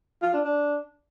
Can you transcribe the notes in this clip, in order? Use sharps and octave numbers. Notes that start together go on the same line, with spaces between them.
F4
D4
D4